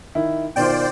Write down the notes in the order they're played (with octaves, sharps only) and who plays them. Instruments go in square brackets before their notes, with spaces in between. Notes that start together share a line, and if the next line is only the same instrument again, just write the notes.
[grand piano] D#3 E4
[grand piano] B2 D#3 F4 [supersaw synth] C5 D5 G5